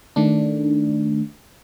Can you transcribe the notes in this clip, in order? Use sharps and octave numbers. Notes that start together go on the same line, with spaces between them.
D#3 A3 D4